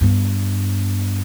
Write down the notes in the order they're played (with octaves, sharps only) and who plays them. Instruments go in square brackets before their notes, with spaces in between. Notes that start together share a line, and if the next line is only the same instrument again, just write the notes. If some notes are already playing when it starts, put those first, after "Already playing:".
[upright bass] G2 B3